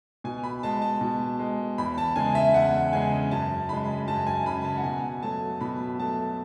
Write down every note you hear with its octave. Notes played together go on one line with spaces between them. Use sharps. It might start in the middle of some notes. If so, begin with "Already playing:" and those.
B2 G#5
B5
G#3 A5
A5
B2
G#3
E2 B5
A5
C#3 G#3 G#5
E5
E2 F#5
C#3 G#3 G#5
F#2 A5
C#3 G#3 B5
F#2 A5
G#5
C#3 G#3 B5
A5
F#5
B2 G#5
F#3 A3 A5
B2 B5
F#3 A3 A5